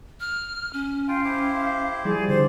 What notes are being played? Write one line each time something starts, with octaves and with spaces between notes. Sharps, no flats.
F6
C#4
F4 F5 G5
E4 G4 C5
F3 G3 E4 G#4 D5
D3 F#4 C5